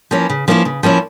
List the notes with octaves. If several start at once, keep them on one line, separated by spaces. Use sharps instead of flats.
F3 A#3 C#4 E4
C#3
F3 A#3 C#4 E4
C#3
F3 A#3 C#4 E4